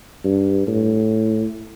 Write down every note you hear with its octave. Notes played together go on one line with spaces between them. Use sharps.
G2
A2